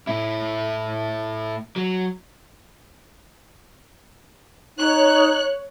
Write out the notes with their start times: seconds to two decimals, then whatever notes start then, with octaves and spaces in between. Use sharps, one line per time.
0.07 A2 E4
1.76 F#3
4.77 D#4 C#5 F#6